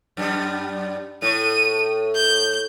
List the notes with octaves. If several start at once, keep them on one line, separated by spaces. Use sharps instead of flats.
F#2 G3
A2 D#7
G6